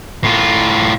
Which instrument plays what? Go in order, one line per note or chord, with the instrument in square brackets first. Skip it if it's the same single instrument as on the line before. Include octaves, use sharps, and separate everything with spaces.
[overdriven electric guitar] A2 F4